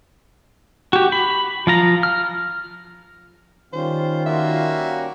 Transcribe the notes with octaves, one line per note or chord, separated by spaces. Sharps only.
F#4 G4
B5
F3 F4 A#5
F6
D#3 G3 C#4 F4 C5
A#3 F#4 E5